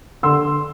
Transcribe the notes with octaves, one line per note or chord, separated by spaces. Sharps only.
D3 C6 E6